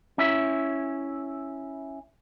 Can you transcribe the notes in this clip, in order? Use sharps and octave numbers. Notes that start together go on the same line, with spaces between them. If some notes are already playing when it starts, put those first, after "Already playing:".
C#4 E4 E5